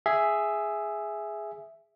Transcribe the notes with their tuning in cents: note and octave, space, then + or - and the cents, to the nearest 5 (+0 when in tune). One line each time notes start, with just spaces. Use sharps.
G#4 +0 E5 +5